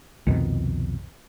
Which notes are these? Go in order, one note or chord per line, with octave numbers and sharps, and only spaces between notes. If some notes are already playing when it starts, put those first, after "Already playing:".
C2 F2 B2 D#3